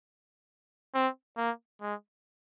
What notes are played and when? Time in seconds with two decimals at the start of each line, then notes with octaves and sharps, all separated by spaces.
0.95 C4
1.37 A#3
1.81 G#3